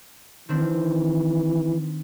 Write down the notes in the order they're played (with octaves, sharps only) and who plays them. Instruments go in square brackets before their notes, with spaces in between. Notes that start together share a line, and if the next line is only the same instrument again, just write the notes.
[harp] D#3 C4 D4 [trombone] E3